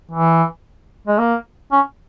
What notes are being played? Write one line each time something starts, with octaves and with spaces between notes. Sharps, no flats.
E3
G#3
A#3
C#4